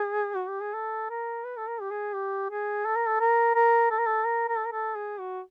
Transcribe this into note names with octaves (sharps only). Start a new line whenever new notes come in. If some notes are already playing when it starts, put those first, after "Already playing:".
Already playing: G#4
F#4
G4
G#4
A4
A#4
B4
A4
A#4
G4
G#4
G4
G#4
A4
A#4
A4
A#4
A#4
A4
A#4
A4
A#4
A#4
A4
A#4
A4
G#4
F#4